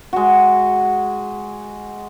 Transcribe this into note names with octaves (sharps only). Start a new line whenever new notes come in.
G#3 F#4